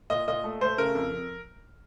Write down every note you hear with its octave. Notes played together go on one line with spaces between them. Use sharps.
A#2 D#5
A#2 D#5
A3
A3 C5
C#3 A#4
F2
F2